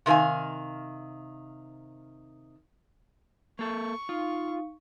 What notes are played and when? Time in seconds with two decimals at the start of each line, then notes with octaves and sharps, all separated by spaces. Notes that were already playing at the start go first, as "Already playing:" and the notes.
0.06 C3 D#3 A4 F5 G#5
3.59 A#3 A4 C#6
4.09 D#4 F4 F5